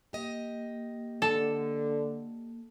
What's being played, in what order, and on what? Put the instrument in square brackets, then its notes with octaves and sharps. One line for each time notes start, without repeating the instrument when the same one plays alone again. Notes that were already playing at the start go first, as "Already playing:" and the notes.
[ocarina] A#3 [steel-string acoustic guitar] G4 D#5
[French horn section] D3 [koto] A4